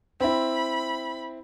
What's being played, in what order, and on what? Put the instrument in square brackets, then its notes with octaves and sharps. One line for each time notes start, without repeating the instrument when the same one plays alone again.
[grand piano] C4 E4 [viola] B5